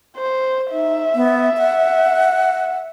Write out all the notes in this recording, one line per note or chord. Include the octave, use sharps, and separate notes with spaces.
C5
D#4 E5
B3
F#5